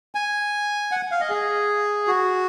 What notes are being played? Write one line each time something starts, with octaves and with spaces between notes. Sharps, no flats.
G#5
F#5
F5
D#5
G#4
F#4